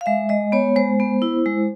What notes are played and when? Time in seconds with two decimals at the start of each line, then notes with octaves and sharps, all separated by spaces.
0.01 F5
0.06 G#3 E5
0.29 G#3 D#5
0.52 B3 C#5
0.76 G#3 C5
1.00 B3
1.22 E4
1.46 G#3